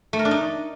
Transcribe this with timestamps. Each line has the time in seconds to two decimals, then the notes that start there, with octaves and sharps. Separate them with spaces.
0.13 A3
0.19 A#4
0.25 D4
0.31 D#4